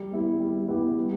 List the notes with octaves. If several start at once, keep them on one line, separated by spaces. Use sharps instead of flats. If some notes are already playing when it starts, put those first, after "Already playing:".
Already playing: G3
B3 E4 G4
G3
B3 E4 G4
G3